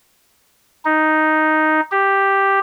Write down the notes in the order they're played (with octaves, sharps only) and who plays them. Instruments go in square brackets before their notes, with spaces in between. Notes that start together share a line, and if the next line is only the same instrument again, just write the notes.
[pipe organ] D#4
G4